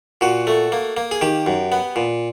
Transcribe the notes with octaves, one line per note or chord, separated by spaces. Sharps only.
A#2 F#4
A3
A#3
A#3
G#4
D#3 G4
F#2
B3
A#2